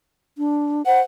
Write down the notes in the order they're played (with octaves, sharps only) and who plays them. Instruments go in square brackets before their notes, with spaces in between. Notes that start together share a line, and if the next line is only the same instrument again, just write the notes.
[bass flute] D4
[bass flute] C5 [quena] F#5